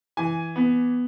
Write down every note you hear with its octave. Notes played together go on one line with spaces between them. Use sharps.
E3 G#5
B3